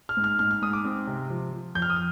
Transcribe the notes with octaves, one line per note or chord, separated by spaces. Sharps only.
F6
G#2
F6
G#2 F6
F6
G#2 D#6
D6
C4
C3
F3
F3
F2 G6
F6
D#6
F6